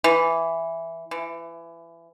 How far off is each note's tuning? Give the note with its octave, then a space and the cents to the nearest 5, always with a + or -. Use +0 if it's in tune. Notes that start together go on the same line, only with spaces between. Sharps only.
E3 +5
E3 +25